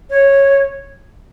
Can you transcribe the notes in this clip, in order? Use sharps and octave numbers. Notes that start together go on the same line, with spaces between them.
C#5